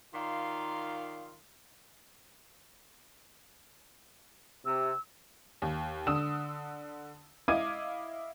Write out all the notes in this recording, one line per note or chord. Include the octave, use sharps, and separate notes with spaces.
D#3 F4 A#4 D5 F5 C6
C3 E6
D#2
D3 D#6 E6 E7
E4 D#5 F5 D6 G#6 D#7